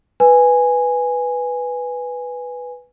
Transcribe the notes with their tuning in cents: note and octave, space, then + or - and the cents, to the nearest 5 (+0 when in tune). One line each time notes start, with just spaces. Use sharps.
B4 +0 G#5 -5